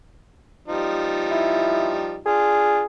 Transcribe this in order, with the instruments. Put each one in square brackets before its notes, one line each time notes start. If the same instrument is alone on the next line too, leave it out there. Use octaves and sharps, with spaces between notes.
[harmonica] F3 G3 D#4
[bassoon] E4
[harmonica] D4 F4 [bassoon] G#4